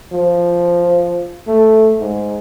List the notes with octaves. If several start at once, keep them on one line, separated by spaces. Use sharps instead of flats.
F3
A3
G#2